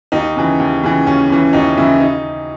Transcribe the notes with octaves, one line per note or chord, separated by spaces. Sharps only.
D#2 D#4
C#3 E3
D#2
C#3 E3
D#2 C#4
C#3 E3
D#2 D#4
C#3 E3 E4
D#4